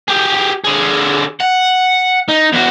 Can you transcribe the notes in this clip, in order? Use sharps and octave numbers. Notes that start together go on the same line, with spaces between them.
G4 G#4
D3 G#4
F#5
D#4
E2 F#4